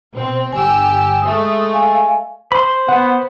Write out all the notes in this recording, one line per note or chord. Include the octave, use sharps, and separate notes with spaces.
B2 C4
G1 G4 G#5 E6
G#3 A3 D#6
F5 G#5
C5 B5 C6
B3 F#5